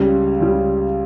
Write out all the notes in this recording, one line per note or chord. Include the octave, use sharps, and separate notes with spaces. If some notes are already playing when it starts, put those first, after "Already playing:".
Already playing: C#2 C#3 G3
C#2 C#3 G3